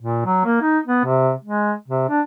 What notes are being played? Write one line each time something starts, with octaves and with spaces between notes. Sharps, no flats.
A#2
F#3
A#3
D#4
B3
C3
G#3
C3
D4